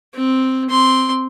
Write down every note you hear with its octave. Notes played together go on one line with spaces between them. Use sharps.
C4
C4 C6